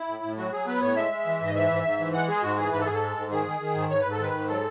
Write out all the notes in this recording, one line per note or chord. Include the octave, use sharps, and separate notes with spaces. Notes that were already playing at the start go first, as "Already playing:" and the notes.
Already playing: E4
A2
A2
F#3 F#4
F#3 G#4
B3 B4
A2 C#5
G#3 E5
G#3
E3
G#2
D#5
E3 E5
G#2
G#2
E3
G#3 F#5
G#3 G#4
G#2 F#4
E3 G#4
G#2 B4
A4
G#2 G#4
A4
G#3
G#2
D#3 G#4
D#3
D#3
G#2
G#2 C#5
G#2 B4
A4
D#3 B4
G#2
F#3 A4